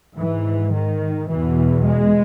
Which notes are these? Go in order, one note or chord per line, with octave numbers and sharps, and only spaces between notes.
G#2 E3
D#3
E2 B2 E3
G#3